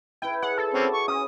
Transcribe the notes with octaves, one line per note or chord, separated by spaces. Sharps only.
E4 B4 G5
G#4 C#5 F#5 B5
A4
C4 C#4 F#4 D6
C#6
C#4 D#6